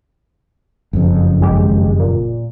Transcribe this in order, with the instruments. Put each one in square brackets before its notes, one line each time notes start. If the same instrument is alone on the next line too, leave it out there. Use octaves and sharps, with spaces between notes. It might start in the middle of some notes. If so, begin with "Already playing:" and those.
[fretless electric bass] F#1 F2
[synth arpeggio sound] G#1 G#3 G4
A#2